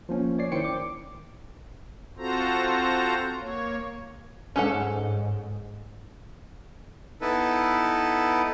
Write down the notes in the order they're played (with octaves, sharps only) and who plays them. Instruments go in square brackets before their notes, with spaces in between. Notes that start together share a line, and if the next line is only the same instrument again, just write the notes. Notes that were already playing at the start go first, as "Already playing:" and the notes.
[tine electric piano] F3 A#3 C#4
C#5 D5 C7
D#3 E4 C5 G5 C#7
D6
[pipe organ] C4 F4 F#4 A4 C5 A#5
A#3 C#5
[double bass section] G#2 [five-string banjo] C#4 A4 F#5
[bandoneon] B3 D#4 E4 A4 B4